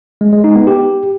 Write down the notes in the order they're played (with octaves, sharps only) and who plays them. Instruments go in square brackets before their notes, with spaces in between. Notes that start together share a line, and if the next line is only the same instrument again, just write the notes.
[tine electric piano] G#3
G#3
D#4
B3
G4